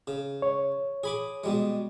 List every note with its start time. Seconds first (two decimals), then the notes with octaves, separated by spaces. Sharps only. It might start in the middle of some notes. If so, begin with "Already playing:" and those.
0.07 C#3
0.42 C#5
1.04 G#4 B5 D6
1.44 B2 G3 G#3